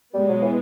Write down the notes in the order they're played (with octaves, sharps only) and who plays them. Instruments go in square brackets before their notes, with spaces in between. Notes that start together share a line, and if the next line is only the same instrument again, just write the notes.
[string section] B2 G#3 B3 [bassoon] G3
[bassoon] F#3
E3